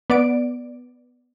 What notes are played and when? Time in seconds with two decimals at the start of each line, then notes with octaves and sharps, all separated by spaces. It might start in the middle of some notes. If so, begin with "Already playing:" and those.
0.10 B3 D5 D7